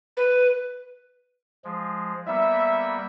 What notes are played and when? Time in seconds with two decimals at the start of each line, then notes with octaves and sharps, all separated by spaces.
0.17 B4
1.65 F3 G#3
2.27 G3 A#3 B3 E5